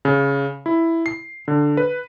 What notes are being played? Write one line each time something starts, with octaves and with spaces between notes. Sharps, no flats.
C#3
E4
C7
D3
B4